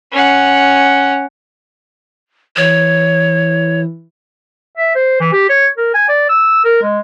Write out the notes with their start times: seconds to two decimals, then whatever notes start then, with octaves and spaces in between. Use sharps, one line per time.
0.12 C#4 F#5
2.57 E3 C#5
4.77 E5
4.95 C5
5.20 E3
5.32 G4
5.49 C#5
5.77 A#4
5.94 G#5
6.09 D5
6.29 E6
6.65 A#4
6.82 G#3